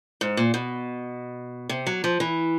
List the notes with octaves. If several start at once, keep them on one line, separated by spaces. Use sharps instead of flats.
G#2
A#2
B2
C3
F#3
F3
E3